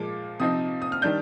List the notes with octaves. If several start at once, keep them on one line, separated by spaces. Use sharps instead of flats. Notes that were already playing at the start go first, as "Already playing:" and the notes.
Already playing: A#2 F3 G#3 D6
C3 F3 C4 D#4 D#6
D#6
F6
D#3 G3 D4 G6